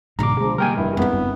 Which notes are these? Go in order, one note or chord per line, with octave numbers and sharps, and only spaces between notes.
G#1 G#2 B2 D3 A#5 D6
F3 G#3 D4
D#3 G3 A#3 A#4 G5 G#5
F1 G2 E4
F2 G#3 B3 C4 D4
F#1